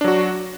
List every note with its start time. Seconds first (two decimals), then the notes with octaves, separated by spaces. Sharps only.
0.01 D4
0.04 F#3
0.08 F#4